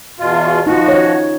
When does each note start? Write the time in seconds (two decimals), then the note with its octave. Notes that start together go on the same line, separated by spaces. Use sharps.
0.19 E2 B2 F4
0.67 F3 D#4 F4 F#4
0.88 C#5